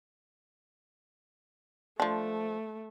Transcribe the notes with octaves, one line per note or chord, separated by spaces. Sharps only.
F3 A3 D4